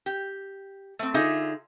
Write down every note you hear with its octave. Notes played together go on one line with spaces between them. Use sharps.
G4
A3 C4
D3 D#4 F4 G#4 E5